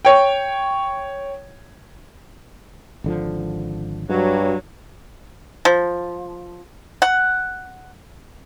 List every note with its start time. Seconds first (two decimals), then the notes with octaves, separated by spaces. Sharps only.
0.05 C#5 G5
3.04 G#1 D3 F3
4.10 G2 F#3
5.65 F3
7.02 F#5